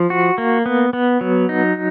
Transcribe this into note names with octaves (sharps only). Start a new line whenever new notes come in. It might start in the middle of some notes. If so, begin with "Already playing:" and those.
Already playing: F3
F#4
A#3
B3
B3
F#3
D#4